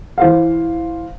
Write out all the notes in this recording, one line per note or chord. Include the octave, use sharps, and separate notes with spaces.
E3 C5 F5